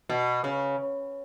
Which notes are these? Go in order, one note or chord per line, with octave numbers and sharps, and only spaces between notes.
B2
C#3